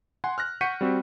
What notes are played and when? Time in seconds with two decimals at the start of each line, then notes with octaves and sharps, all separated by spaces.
0.24 F#5 G#5 C6
0.38 F6 F#6 A#6
0.61 F#5 C#6 G6 B6 C#7 D#7
0.81 G3 C4 F#4